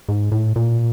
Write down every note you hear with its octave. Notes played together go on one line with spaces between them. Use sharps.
G#2
A2
A#2